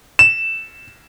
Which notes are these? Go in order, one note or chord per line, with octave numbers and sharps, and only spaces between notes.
E7